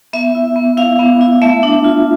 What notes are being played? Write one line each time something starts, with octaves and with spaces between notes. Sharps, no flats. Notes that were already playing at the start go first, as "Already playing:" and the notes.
B3 E5
E4
B3
E4 F5
B3
E4
A3 E5
D4
F4